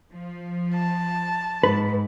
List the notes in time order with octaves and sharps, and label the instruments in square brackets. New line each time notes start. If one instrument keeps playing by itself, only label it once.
[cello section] F3
[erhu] A5
[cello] G#2 [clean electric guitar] B4